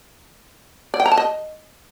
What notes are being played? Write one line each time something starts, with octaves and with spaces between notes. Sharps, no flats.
D5
G5
A#5
A5
D#5